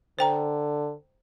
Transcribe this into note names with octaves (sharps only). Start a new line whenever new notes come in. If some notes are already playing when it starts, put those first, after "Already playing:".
D3 C5 G5 A#5